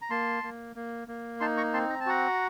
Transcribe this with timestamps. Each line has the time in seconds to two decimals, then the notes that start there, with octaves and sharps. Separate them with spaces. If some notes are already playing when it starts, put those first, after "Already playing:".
0.02 A#5
0.10 A#3 A5 C6
0.43 A#3
0.76 A#3
1.08 A#3
1.40 D#4 A5 C6
1.57 A#5 C#6
1.73 C4 A5 C6
1.89 A#5
2.00 A5
2.06 F#4 F#5 A#5